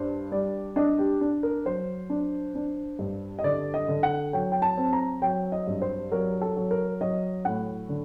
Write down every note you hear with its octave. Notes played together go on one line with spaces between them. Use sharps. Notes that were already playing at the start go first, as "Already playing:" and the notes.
Already playing: G2 D4 C5
G3 D5
D4 D#5
G4
D4
A#4
F#3 C5
D4
D4
G2
D#5
D3 D5
D#5
D3
F#5
F#3 G5
G5
A5
C4
A#5
F#3 G5
D#5
G2
C5
F#3 A#4
A4
F#3
A#4
F#3 D#5
A2 F#5
D3